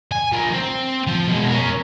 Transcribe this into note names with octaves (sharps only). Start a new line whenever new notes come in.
G#5
F3 A#4
C4
F3
B2 G#3
C#4 A#4